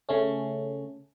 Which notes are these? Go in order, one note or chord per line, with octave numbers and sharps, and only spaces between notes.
C#3 A3 C#4